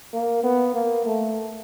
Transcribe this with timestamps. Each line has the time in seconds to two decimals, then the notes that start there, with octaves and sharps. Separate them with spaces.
0.13 A#3
0.43 B3
0.74 A#3
1.05 A3